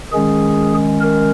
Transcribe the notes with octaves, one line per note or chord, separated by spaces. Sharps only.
D#3 G#3 C#4 G#4
A#4